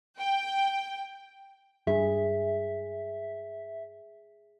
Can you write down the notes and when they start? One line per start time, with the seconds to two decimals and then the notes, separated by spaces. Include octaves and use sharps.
0.18 G5
1.87 G2 G#4 E5